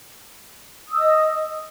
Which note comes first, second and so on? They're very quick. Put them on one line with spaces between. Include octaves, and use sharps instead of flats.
D#6 E6 D#5